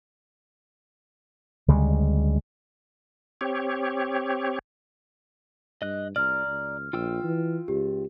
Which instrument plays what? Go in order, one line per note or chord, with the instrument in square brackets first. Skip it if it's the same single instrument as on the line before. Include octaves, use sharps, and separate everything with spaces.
[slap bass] D2 C#3 G3 G#3
[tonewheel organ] C4 G4 C#5
[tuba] G2 [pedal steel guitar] D#5 F#6
[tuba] C2 [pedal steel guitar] D5 A#5 [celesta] F6
[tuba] C#2
[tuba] A#1 [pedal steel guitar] F4 G5 E6
[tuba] E3
[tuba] C#2 [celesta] G4